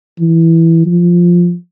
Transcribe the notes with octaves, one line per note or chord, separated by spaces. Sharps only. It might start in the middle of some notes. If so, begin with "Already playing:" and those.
E3
F3